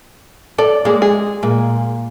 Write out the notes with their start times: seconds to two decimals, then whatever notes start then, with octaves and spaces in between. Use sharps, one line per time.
0.58 A4 D5
0.85 G#3 A#3 G#4
1.02 G#4
1.43 A#2 G#3 A#3